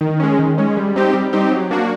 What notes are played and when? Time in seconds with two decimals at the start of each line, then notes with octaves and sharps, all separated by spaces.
0.01 D#3
0.20 G#3 C#4
0.39 D#3
0.58 G#3 C#4
0.77 G3
0.96 C4 D#4 G4
1.14 G3
1.33 C4 D#4 G4
1.51 F#3
1.71 A#3 D4 F#4